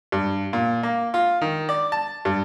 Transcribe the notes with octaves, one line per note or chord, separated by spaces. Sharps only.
G2
A#2
A#3
F4
D#3
D5
A5
G2